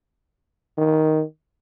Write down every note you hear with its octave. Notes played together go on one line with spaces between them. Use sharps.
D#3